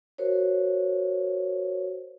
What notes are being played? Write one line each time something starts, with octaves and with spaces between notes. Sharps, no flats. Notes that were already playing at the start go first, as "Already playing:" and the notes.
F#4 A#4 C5 C#5